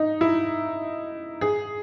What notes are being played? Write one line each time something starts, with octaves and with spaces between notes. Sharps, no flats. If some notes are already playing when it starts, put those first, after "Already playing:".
Already playing: D#4
E4
G#4